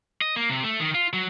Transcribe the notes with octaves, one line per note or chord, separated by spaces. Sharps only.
D#5
A#3
C3
A3
D#3
F4
F#3